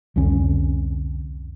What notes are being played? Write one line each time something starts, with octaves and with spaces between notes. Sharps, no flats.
C2 F2 D3 C#4